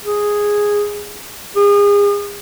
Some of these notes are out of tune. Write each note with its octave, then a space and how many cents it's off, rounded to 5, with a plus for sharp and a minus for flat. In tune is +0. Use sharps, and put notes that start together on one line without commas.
G#4 -5
G#4 -35